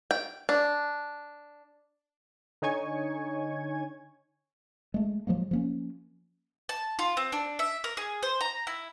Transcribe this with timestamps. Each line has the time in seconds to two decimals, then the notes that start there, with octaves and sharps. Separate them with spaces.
0.11 G5
0.49 D4
2.62 D3 D#4 C#5 G#5 C#6 G#6
4.94 G#3 A3
5.27 F3 F#3 G#3 A#3
5.51 F3 A#3 C#4
6.69 A5
6.99 F4
7.17 C4
7.32 D4
7.59 E5
7.84 A#4
7.97 G#4
8.23 C5
8.41 A#5
8.67 E4